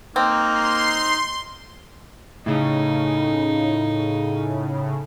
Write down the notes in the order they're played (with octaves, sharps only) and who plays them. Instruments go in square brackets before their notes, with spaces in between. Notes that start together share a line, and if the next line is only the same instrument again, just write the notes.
[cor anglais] A#3 [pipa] C4 [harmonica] D#4
[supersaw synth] C6
[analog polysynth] A2 C#3 [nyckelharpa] D#4